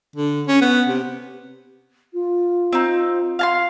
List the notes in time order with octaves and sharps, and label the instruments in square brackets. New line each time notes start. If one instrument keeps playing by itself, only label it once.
[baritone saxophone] D3
C#4
B3
C3
[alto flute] F4
[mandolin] C4 D#4
F5 A5 C6